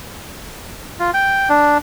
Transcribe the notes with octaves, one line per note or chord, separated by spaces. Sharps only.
F4
G5
D4